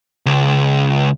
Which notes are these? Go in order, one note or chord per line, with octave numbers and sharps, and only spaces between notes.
C#2